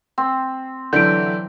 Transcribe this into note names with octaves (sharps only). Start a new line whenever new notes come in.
C4
D3 E3 F#3 D4 E4 G6 D7